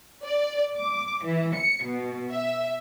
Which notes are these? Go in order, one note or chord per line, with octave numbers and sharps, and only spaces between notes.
D5
D6
E3
C#7
B2
E5